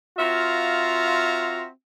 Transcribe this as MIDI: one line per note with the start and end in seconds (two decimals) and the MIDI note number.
0.18 1.67 60
0.18 1.67 65
0.18 1.67 66
0.18 1.67 76
0.18 1.67 77
0.18 1.67 82